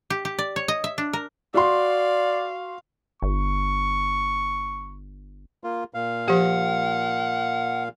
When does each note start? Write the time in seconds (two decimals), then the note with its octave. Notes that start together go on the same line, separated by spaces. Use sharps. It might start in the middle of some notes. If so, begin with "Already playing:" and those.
0.10 G4
0.25 G4
0.39 D5
0.56 C#5
0.68 D#5
0.84 E5
0.98 D4
1.13 A#4
1.54 F#4 D5 F5 C6
3.22 G1 C#6
5.64 A#3 F4
5.94 A#2 F5
6.28 F3 G4 F#5